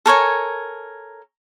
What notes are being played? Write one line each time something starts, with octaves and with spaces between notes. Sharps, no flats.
A4 A#4 C#5 G#5